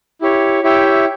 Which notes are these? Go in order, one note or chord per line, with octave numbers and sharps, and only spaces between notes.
E4 G4 C#5
E4 G4 C#5 E5 G5